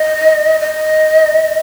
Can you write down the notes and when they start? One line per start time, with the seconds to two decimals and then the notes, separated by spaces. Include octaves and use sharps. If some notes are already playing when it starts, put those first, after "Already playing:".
Already playing: D#5
0.60 D#5